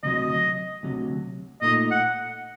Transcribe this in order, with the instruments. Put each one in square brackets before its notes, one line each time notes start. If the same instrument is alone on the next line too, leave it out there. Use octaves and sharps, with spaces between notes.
[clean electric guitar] D2 C3 F#3 [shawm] D#5
[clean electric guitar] D2 C3 F#3
[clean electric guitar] A#2 A3 D#4 [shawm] D#5
[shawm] F#5